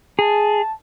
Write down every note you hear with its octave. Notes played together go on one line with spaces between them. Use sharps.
G#4 A5